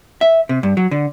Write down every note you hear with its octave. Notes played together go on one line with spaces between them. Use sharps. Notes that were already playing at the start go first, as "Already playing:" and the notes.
E5
C3
G2
F#3
D3